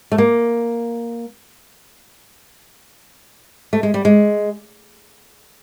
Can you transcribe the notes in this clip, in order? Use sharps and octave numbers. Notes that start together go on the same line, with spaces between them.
A3
A#3
A3
G#3
G3
G#3